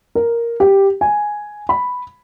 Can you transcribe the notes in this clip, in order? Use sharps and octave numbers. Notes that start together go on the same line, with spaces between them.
A#4
G4
G#5
B5